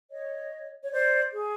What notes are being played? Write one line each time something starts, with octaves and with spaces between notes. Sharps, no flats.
C#5 D#5
C#5
C5 D5
G#4